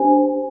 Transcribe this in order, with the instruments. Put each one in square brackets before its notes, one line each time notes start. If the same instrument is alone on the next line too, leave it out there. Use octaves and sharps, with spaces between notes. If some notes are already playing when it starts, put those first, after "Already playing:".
Already playing: [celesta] D4 G4 C5 G#5